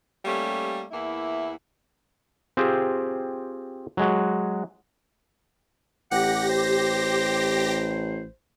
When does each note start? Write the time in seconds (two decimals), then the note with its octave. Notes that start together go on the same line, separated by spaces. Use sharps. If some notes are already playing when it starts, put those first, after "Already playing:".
0.24 G3 A3 A#3 C#4 G4
0.91 E2 A#3 E4
2.57 C4 F4 G4 G#4 C5
3.97 F#3 G#3 F#4
6.11 A1 G4 F#5 A#6
6.49 C5